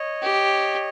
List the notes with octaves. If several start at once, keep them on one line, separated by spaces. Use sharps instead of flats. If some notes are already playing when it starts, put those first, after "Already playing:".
Already playing: C#5 D#5
G4